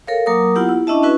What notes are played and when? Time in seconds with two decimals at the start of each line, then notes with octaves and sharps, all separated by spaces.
0.07 A4 A#4 C#5 F5
0.26 F#3 A#3 A#4 A#5 D6 D#6
0.55 B3 E4 F4 G4 F#5
0.69 E4
0.87 C#4 D4 E4 D#5 E5 A5
1.03 C#4 E4 F#4 B4